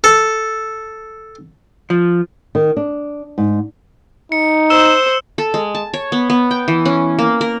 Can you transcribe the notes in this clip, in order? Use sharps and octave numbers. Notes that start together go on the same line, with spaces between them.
A4
F3
D#3
D4
G#2
D#4 C#7
C5 E6 E7 G7
A4
G#3
A5
C#5
B3
B3
G5
E3
C#4
A#3
A#4